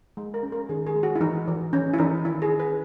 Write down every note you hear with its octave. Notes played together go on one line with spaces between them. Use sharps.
G#3
A#4
C#4
A#4
D#3 G#4
G#4
G#3
F#4
E4
E3 D#4
E3
E3 C#4
E4
E3 D#4
D#3 E4
G#4
C#4
B4